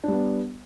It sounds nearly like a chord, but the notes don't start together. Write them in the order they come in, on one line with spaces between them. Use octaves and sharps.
D4 G3 B3